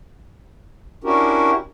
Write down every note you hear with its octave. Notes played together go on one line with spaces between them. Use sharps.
C#4 D4 E4 F#4 G4 A#4